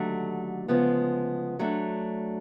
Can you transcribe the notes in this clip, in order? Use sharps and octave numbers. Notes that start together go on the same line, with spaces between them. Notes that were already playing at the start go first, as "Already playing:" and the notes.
Already playing: D#2 D3 F#3 A3
D2 C#3 F3 G#3 B3
F#3 A3 D4